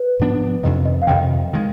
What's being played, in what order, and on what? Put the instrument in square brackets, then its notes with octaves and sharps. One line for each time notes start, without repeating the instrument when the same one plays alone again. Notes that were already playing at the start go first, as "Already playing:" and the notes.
Already playing: [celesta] B4
[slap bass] G#2 F3 B3 D4
[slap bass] F2 C3 D#3 [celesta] D#5
[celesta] D#5
F5
[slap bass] F2 C3 D#3 [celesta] G5
[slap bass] D#3 G#3